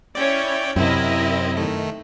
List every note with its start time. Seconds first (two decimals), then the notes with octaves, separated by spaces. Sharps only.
0.15 C#4 E4 C#5 D5 G5
0.76 F#2 C3 C4 E4 A#4 D#5
1.57 D#3 A3